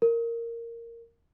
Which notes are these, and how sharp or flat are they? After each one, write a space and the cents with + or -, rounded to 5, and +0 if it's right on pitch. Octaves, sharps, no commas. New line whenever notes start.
A#4 -10